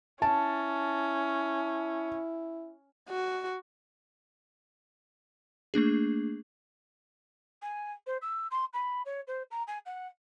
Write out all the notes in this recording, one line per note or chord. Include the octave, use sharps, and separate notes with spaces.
C#4 E4 A5
F#4
A3 A#3 D4 G#4
G#5
C5
E6
C6
B5
C#5
C5
A#5
G#5
F#5